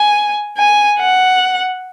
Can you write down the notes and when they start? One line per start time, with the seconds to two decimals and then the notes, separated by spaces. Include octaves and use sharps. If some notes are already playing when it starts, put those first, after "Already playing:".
Already playing: G#5
0.57 G#5
1.00 F#5